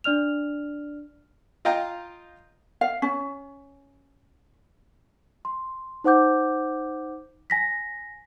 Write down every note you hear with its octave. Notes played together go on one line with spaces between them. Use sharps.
D4 D5 F6 F7
F4 D#5 F5 G5 A#5
F5
C#4
C6
D#4 C5 F#5 D6 G6
G#5 A#6 B6